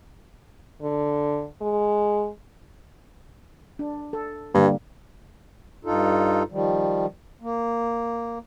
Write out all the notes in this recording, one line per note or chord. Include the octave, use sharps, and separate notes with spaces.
D3
G#3
D4
A4
G2 D3 G3 A#3
G2 D#4 F4 A4
D#3 F3 G3
A#3